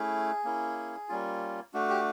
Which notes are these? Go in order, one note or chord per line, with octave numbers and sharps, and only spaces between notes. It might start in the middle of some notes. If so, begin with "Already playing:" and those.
Already playing: A3 C#4 E4 G#4
A#3 C#4 E4
G3 A#3 C#4 F4
A3 D4 F#4
G4